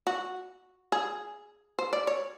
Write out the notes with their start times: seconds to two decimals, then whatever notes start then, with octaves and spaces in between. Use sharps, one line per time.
0.07 F#4
0.92 G#4
1.79 C5
1.93 D5
2.07 C#5